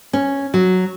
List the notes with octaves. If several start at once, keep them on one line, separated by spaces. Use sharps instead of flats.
C#4
F#3